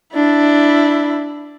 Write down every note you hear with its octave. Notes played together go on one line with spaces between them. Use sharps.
D4 E4